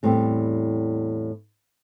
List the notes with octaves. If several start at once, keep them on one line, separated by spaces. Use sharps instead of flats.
E2 A2 G3 C4